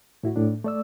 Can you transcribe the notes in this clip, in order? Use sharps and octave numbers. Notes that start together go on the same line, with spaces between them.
A2 E4 F#4
A2 D4
A3 D5 E6